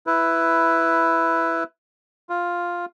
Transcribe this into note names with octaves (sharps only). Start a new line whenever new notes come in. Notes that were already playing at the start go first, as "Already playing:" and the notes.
E4 B4
F4